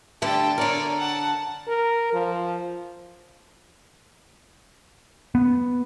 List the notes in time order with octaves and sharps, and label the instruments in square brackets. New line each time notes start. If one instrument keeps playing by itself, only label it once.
[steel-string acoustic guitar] D3 G3 A3 [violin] G5 A5
[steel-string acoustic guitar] D3 A#4 [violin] C#5 D5
[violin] F#5 A5
[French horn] A#4
F3
[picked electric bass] B3